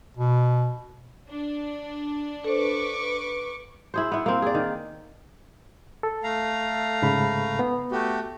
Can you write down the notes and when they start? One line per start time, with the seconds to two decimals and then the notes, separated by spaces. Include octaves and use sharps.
0.17 B2
1.30 D4
2.44 A4 B4 C5 C#6 D6
3.94 E4 G#4 C5
4.12 B3 E4
4.26 A#3 C4
4.42 G#4 D5
4.54 D#3
6.03 A4
6.24 A3 F5 A#5
7.02 G#2 C#3 B5
7.59 B3
7.92 A3 F#4 G4